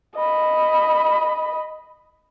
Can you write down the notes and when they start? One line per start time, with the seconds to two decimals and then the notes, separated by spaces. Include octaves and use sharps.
0.16 D#5 B5